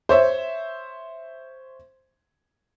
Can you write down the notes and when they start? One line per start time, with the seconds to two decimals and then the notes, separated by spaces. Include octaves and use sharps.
0.09 C5 C#5 E5